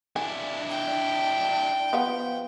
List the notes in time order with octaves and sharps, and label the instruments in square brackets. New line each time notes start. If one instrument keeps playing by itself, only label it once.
[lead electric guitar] D4 E4 [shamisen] G#5
[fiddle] G5
[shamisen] F3 B3 F4